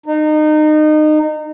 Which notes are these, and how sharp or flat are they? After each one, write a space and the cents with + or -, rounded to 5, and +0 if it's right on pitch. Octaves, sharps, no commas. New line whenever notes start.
D#4 -25